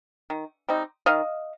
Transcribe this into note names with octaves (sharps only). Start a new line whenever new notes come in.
D#3
G3 C4 D#4
D#3 D#5 F5